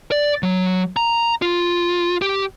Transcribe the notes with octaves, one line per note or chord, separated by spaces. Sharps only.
D5
F#3
A#5
F4
G4